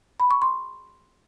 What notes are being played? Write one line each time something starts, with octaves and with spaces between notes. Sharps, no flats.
B5
C#6
C6